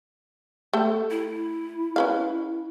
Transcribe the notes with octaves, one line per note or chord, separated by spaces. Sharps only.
A3 G4 A4
E4
C#4 B4 F5